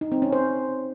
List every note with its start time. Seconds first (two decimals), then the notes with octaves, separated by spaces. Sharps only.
0.01 D#4
0.12 C4
0.22 C#4
0.33 C5